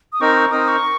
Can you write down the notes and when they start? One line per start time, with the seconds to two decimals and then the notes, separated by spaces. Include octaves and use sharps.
0.13 D#6
0.21 C4 D#4 A#4 C#6
0.36 C#6
0.51 C4 D#4 A#4 D#6
0.68 C#6